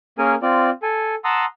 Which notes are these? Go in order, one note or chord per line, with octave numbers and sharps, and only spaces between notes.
A#3 C#4 G#4 A#4 G#5
C4 F4 D5
A4 G#5
F#5 A5 A#5 C6 D#6 E6